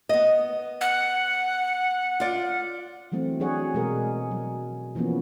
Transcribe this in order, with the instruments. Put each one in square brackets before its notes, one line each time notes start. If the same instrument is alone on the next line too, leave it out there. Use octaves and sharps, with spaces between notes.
[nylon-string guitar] B3 D#5
[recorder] F#5
[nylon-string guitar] F4 D5
[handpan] E3 F#3 A3 C4
F#3 D4 G#4 C#5 F#5
B2 G#3 G#4 A#4
F#3
E3 F3 A#3 B3 C#4